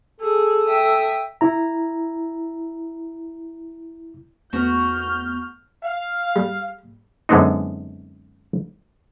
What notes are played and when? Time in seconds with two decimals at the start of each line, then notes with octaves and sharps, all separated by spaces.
0.20 G#4 A4
0.67 E5 G5 D#6
1.41 E4 A#5
4.53 E2 A3 B3 F#4 F6 G6
5.84 F5
6.36 G3
7.29 F#2 D3 G#3 B3 C4 D#4